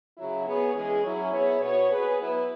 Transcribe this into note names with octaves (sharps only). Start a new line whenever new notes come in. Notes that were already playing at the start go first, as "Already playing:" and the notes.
C#3 F#3 E4
B3 G#4 C#5
E3 G#3 C#4 G#4
F#3 C#4 E4
B3 E4 G#4 C#5
B2 B3 F#4 C#5
B3 G#4 B4
F#3 B3 E4 B4